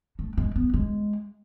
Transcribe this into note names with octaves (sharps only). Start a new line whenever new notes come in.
A3
G#3
B3
G#3